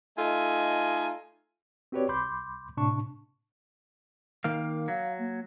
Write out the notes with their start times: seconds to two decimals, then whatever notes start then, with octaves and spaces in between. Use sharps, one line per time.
0.18 A3 D#4 F4 A4 D#5 G#5
1.92 C4 F#4 G4 B4 C#5 D5
2.09 C2 B5 C6 D6 G6
2.77 A2 C3 D4 A5 C#6
4.44 D#3 A#3 F5
4.88 F#3 F5
5.18 A#3